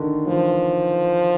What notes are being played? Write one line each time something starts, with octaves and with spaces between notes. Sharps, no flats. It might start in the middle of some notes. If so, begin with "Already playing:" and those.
Already playing: D3 D#3
E3 F3